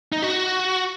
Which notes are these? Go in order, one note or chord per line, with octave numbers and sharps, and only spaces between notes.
D#4
F#4